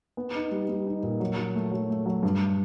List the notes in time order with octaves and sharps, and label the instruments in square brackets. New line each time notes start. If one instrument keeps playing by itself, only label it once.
[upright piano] B3
D#4
G3
G3
D#4
A#2
F#3
F#3
A3
F#3
A3
F#3
G2